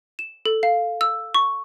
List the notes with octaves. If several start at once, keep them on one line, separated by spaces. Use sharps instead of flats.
E7
A4
F5
E6
C#6